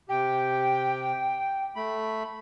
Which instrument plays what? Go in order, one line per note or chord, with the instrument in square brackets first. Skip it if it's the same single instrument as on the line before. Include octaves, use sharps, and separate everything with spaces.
[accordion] C3 G4 [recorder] G5
[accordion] A3 B5